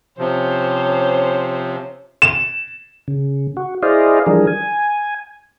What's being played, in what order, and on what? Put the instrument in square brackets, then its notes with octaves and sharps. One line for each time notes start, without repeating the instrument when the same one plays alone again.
[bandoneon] C3 F3 [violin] C#4 C5
[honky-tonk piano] E7
[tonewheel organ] C#3
F#4
E4 G#4 C5 D5 D#5 F5
E3 F3 G3 D4 G#4 A#4
G#5